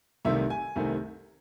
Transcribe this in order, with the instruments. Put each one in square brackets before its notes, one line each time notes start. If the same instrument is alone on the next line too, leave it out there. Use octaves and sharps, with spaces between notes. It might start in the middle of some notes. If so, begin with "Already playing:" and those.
[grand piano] C2 C3 D#3 A3 E5
G#5
C2 C3 D#3 A3